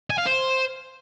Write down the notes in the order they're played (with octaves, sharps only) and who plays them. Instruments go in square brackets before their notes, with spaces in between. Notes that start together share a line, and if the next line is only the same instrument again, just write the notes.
[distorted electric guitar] G#5
F5
C5